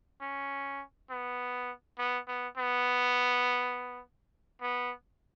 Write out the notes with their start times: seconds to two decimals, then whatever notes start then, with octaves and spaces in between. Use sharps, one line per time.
0.21 C#4
1.10 B3
1.98 B3
2.27 B3
2.57 B3
4.61 B3